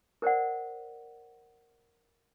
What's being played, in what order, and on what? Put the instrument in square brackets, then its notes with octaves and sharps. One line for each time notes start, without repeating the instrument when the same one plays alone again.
[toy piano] A#4 C5 D5 F#5